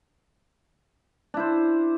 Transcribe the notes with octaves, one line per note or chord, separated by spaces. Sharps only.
D4 E4 C5